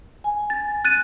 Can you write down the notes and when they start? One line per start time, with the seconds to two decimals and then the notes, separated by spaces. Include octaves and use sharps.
0.24 G#5
0.50 A6
0.85 F#6 A6 D#7